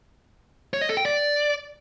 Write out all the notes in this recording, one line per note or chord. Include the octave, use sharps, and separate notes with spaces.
C#5
D#5
A4
G5
D5